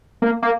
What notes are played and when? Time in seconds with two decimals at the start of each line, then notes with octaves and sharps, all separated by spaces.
0.22 A#3
0.42 A#3